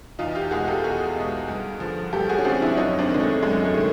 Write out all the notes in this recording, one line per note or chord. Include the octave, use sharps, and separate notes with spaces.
E2 D#4 F4
F4 G4
B2 G#3 F#4 G#4
G4 A4
E2 F#4 G#4
B2 G#3
G2
D3 F3
G2 G4 A4
F#4 G#4
C#4
D3 F3 C4 D4
D4 E4
F#2 C#4 D#4
C4 D4
D#3 G#3
A3
F#2 G#3
A3
D#3 G#3